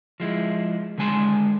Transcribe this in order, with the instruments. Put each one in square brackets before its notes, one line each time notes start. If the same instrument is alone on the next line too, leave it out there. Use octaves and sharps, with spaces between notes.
[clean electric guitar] F3 G#3 E4
D3 D#3 G#3 G#5 A5 C6